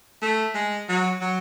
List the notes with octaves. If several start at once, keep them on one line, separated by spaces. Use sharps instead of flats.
A3
G#3
F#3
F#3